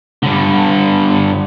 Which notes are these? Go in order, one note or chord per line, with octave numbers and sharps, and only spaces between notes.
G2 D3